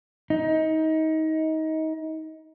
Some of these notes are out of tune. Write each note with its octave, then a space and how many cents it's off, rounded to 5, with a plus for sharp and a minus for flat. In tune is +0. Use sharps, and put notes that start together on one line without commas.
D#4 +25